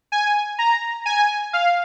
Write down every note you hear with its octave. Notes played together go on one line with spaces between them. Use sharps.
G#5
A#5
G#5
F5